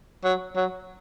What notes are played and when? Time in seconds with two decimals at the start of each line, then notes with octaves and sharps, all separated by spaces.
0.24 F#3
0.56 F#3